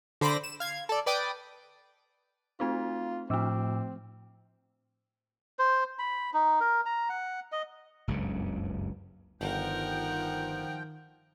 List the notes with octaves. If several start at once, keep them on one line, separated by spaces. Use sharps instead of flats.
D3 C5 B5 D6 A#6
E7
F5 G#6
A4 D5
B4 D5 G5 D6 D#6
A3 C4 D#4 F4
A2 F3 A3 C4 D6 E6
C5
B5
D#4
A#4
A#5
F#5
D#5
F#1 C#2 G2 C#3
G1 D#3 F3 A#4 F#5 G5